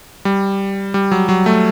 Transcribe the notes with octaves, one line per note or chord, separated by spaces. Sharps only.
G3
G3
F#3
F#3
A3